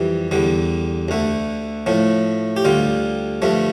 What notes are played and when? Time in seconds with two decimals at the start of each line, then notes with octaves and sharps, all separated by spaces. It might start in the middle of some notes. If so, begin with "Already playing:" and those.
Already playing: F2 E3 G3
0.31 E2 D3 G3
1.08 D2 D3 A3
1.86 A2 F3 A3
2.56 G4
2.65 D2 D3 G3 F4
3.42 G2 F3 A3